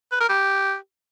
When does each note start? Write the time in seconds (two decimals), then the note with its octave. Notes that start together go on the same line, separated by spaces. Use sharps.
0.12 B4
0.20 A#4
0.29 G4